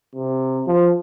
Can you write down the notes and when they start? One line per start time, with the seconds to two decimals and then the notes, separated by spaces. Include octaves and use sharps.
0.15 C3
0.67 F3